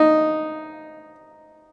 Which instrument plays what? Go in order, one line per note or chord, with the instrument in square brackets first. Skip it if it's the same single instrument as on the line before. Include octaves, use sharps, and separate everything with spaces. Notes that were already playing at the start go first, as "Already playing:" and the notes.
Already playing: [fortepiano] D#4